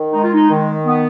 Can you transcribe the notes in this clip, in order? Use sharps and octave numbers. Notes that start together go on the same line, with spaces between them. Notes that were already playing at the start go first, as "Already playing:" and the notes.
Already playing: D#3
G#3 D#4
F4
D#4
D#3
B3